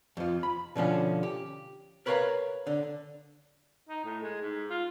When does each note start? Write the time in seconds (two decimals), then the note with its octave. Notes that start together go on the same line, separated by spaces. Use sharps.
0.17 F2 F3
0.43 B5
0.75 B2 D3 F3 C#4
1.23 G4
2.06 A#4 B4 C#5 D5 F5 A#5
2.67 D3
3.89 D#4
4.04 A2
4.23 G#3
4.41 G#2
4.70 F4